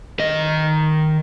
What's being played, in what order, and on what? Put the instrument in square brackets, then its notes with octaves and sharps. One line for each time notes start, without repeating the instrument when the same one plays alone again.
[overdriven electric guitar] D#3 D#5